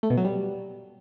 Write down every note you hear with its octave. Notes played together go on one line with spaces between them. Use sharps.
A3
B2
F#3
G3